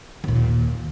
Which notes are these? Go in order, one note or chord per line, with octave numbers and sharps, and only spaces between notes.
D#2 A#2